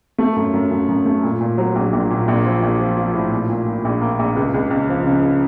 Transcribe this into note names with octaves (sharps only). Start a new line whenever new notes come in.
A3
F#2
F#2
F#2
F#2
A3
A#2
A#2
F#3
A#1
A#1
A#2
A#1
F3
A#1
F3
F3
A2
A#2
A#2
A#2
A#1
A#3
A#1
C#2
C#2
C#2
F3
C#3